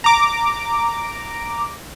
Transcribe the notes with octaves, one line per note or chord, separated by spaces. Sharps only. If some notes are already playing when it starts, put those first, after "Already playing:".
A#5 D6